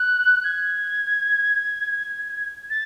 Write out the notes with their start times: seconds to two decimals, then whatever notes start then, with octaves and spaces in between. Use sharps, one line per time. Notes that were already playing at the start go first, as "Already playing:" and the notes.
Already playing: F#6
0.44 G#6
2.70 A6